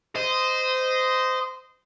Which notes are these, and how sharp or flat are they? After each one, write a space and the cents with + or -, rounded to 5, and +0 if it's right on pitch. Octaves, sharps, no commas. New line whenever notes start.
C5 -20 D#5 +0